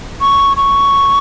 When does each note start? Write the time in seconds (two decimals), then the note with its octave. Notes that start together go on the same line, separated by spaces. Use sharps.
0.21 C#6
0.57 C#6